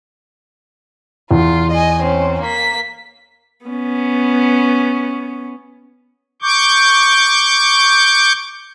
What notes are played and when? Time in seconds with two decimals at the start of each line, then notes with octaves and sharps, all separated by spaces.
1.31 E2 F4
1.72 D#5 G#5
2.03 C4 C#4
2.41 A#3 B6
3.66 B3 C#4
6.42 C#6 D6 G6